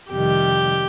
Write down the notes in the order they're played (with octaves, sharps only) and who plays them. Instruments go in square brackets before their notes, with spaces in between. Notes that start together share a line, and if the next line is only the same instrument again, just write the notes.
[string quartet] F2 C3 D#3 G3 G4